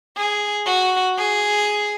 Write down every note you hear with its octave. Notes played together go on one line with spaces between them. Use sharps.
G#4
F#4
G#4